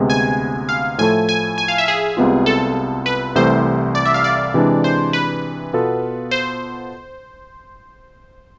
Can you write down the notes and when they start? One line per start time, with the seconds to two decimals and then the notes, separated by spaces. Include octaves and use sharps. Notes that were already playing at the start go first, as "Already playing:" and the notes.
Already playing: D2 C3 G#3 B3
0.10 G#5
0.69 F5
0.98 A2 F3 A3 E4 A4 G#5
1.29 G#5
1.58 G#5
1.68 F5
1.78 E5
1.88 G#4
2.17 C2 C3 G#3 B3 F4
2.46 A4
3.06 B4
3.35 C2 C3 E3 A3 C5
3.95 D5
4.05 E5
4.14 F5
4.24 D5
4.54 C3 E3 G#3 D4
4.84 C5
5.13 B4
5.73 B2 B3 F4 A4
6.31 C5